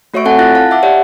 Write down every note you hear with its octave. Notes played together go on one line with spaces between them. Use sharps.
A3 F#4 C#5 E5 C#6 D7
C4 A4 F#5 G#5 A5
E4 F4 F#6 A6 A#6
F5 A5
E5 F#5 D6
G4 C#5 D5 E5 F#5